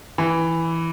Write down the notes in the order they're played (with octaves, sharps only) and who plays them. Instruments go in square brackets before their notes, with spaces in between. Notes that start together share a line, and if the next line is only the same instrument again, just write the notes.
[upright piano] E3